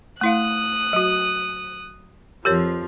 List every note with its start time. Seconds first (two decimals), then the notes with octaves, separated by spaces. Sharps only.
0.21 A3 E4 F5 D#6 F#6
0.93 F#3 F#4
2.45 F2 F3 G4 A#4 C#5